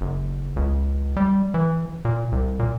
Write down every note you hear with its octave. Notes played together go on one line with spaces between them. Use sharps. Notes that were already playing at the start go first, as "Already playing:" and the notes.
F#1
C#2
G3
E3
A#2
C2
A#2